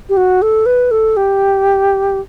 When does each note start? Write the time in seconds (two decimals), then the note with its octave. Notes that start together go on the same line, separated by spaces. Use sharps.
0.09 G4
0.17 F#4
0.42 A4
0.66 B4
0.91 A4
1.17 G4